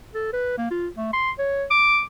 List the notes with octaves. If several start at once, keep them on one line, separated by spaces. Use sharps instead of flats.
A4
B4
A#3
F4
A3
C6
C#5
D6